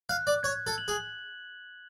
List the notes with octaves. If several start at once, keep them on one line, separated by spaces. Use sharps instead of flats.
F5 F#6
D5
C#5 G#6
A4
F#7
G#4